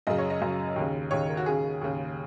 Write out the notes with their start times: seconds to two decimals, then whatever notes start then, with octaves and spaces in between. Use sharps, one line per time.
0.07 F#2 C#3 D#5
0.18 C#5
0.30 D#5
0.41 F#2 C#3
0.76 D#2
0.81 C#3
1.11 D#2 C#3 C#5
1.29 A#4
1.37 F#4
1.46 D#2 C#3 G#4
1.81 D#2 C#3